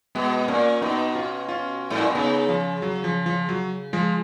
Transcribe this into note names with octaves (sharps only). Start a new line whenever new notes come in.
B2 G#3 B3
B3
A#2 A#3 C#4
B2 B3 D#4
C#4 F4
C#4 F4
G#2
A#2
B2
C#3 B3 D#4
F3
F#3
F3
F3
F#3
F3 G#3